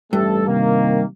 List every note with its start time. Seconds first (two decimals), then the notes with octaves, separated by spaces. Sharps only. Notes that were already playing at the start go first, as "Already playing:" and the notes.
0.13 A1 G2 A3 A4
0.47 C3 D#3 A#3